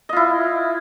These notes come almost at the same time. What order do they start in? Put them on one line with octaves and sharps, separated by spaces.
D#5 F4 E4